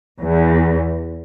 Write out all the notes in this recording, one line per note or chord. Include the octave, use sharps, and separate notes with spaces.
E2